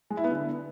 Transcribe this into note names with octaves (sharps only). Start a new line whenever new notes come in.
G#3
E4
B3
D3